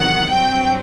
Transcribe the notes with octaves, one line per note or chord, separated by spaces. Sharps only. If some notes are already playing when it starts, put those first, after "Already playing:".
Already playing: E2 C3 D#3 F#3 F#5
G2 F#3 C4 G5